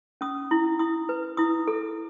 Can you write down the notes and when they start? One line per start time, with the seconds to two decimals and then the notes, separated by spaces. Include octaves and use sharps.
0.21 C#4 D#6
0.51 E4
0.79 E4 D#6
1.09 B4
1.37 E4 D#6
1.68 A4